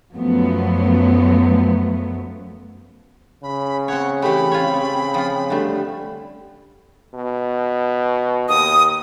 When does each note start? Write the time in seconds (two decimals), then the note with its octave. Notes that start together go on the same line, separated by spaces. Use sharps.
0.13 F#2 F3 F#3 A3 B3
3.43 C#3 B5
3.88 C4 C#5 F#5
4.22 E3 A3 G4 B5
4.52 C#3 C4 F4 C#5
5.14 F3 F4
5.50 D3 G3 A3
7.14 B2
8.49 D#2 D#6